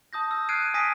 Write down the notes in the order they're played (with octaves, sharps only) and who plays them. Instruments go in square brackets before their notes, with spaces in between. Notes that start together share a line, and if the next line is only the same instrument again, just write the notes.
[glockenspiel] A5 D#6 G6 A#6
E6
F6 F#6 G#6 C7 D7 D#7
G#5 D#6 A#6 B6 D7 D#7